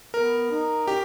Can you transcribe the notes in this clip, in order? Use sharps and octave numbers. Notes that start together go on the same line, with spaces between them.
B3 A#4
D#4
C#4 G4